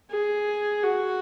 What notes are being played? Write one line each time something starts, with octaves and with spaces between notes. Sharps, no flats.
G#4
F#4